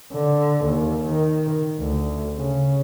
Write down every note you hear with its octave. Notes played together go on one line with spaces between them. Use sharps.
D3
D#2
D#3
D2
C#3